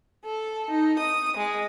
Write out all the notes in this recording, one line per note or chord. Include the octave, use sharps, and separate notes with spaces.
A4
D#4
D#6
G#3